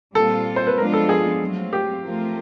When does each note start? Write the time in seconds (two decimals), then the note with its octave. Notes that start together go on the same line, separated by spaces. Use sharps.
0.15 A#2 G3 C4 F4 A4
0.56 C5
0.67 B4
0.78 F3 G#3 B3 D4 F4 A#4
0.93 A4
1.09 G#4
1.41 F#3 A3 C4 F4
1.73 G4
2.03 F3 A3 C4 F4 A#4